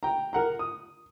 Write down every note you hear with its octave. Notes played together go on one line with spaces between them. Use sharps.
G5 A#5
A#4 F#5 A#5
D#6